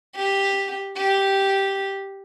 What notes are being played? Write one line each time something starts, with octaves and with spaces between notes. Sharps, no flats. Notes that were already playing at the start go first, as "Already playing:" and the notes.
G4
G4